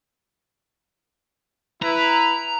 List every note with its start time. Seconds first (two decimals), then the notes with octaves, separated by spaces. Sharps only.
1.83 E4 B4 A#5